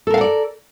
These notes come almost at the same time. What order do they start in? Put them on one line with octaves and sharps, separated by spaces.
A4 A#4 F5 F#5 D5